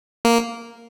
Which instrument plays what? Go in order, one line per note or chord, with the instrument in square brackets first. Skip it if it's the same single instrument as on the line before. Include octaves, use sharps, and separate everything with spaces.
[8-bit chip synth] A#3